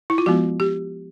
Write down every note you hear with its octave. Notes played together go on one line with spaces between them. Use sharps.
E4
F4
F3 G#3 B3 F#4
G4